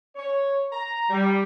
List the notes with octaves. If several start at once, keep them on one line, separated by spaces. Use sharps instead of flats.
C#5
A#5
G3